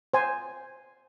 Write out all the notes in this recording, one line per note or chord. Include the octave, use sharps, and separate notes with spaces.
C5 G#5